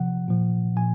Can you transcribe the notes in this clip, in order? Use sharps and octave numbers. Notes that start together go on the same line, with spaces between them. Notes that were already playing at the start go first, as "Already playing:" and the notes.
Already playing: C3 F3 F#5
A#2 F3
A#2 F3 G#5